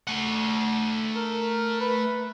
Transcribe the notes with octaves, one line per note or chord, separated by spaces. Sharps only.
A3 F#5
A#4
B4